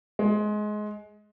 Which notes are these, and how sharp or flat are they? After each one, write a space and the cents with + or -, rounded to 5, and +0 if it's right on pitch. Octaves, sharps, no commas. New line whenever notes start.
G#3 +20